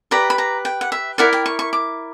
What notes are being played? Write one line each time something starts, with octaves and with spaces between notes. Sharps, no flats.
G4 B4 D5 A#5
B5
A#5
G5
F#5
E5
E4 A#4 D5 F#5
G5
C#6
C#6
D6